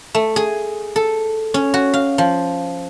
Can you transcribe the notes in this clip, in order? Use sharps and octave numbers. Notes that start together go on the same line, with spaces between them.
A3
G#4
A4
C#4
F#4
F5
F3